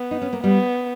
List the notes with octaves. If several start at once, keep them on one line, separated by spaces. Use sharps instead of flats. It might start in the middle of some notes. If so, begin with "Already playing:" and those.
Already playing: B3
D#4
C#4
A#3
G3 B3